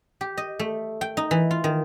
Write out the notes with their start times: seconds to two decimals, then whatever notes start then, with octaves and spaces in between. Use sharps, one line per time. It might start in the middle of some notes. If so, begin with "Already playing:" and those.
0.21 G4
0.37 D#5
0.59 A3
1.01 G5
1.17 D#4
1.31 E3
1.51 F4
1.64 D#3